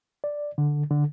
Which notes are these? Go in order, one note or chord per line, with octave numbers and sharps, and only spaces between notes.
D5
D3
D3